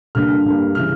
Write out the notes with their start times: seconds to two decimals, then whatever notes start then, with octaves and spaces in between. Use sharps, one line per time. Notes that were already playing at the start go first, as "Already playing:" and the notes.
0.15 G2 D3 G3 A#3 F6
0.45 G2 D3 G3 A#3
0.75 C#3 E3 F6